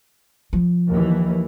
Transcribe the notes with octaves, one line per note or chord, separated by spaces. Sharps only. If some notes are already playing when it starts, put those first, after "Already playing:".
F3
D#2 E3